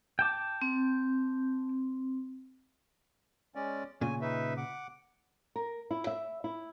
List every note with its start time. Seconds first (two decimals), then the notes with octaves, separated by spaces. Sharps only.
0.19 G5 A5 D6
0.62 C4
3.55 G#3 C#4 D5
4.01 A#2 C#3 G#5
4.21 D#4 B4 E5
4.57 F#5 D6
5.56 A#4
5.91 E4
6.07 E5
6.44 E4